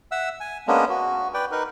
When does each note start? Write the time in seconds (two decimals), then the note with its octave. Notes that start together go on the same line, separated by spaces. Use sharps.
0.11 E5 F#5 E6
0.40 G#5
0.67 G#3 A#3 B3 C#4 D4
0.89 F#4
1.34 B4 D5 G5
1.51 D#4 A#4 B4